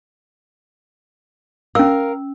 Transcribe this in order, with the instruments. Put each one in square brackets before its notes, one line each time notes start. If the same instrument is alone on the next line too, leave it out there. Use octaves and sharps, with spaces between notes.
[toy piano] C#4 E6 [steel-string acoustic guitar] A#4 F5